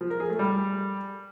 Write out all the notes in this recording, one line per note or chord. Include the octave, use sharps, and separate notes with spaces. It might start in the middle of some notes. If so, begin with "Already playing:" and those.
F3
A#4
G#4
A3
G3